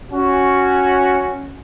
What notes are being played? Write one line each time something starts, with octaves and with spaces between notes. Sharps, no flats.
C#4 F#4